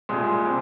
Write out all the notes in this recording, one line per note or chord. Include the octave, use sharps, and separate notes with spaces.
C2 A#2 G3 G#3
C3